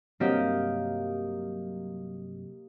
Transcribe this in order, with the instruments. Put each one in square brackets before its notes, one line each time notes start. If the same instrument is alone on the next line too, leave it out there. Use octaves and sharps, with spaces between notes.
[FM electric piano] G2 C3 F#3 [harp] A#3 G4 D#5